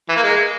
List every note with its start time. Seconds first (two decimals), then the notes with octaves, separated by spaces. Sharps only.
0.09 E3
0.16 A#3
0.23 G#3